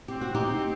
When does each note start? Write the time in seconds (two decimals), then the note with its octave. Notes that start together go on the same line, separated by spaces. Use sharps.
0.08 C4 G4
0.21 F#4
0.34 D#4 G4